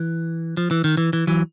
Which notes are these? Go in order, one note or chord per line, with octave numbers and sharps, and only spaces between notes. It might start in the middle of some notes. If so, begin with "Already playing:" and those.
Already playing: E3
F3
E3
D#3
E3
E3
E3 F#3